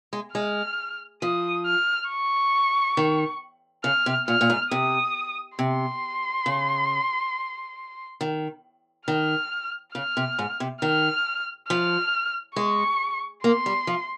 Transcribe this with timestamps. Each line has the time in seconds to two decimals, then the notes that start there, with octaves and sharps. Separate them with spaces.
0.13 G#3
0.35 G#3 F6
1.22 F3 D#6
1.66 F6
2.10 C#6
2.97 D#3
3.84 C#3 F6
4.06 C3
4.28 A#2 F6
4.41 A#2
4.50 G#2
4.71 C3 D#6
5.58 C3 C6
6.46 C#3
8.21 D#3
9.07 D#3 F6
9.94 C#3 F6
10.17 C3
10.39 G#2
10.60 C3
10.82 D#3 F6
11.69 F3 F6
12.56 G#3 C#6
13.44 A#3 C6
13.66 G3
13.87 F3